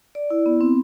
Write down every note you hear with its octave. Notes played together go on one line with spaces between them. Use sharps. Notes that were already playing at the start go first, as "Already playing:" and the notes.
D5
E4
B3
C4